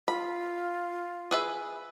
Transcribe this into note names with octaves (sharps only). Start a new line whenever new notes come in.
F4 B5
G#4 B4 E5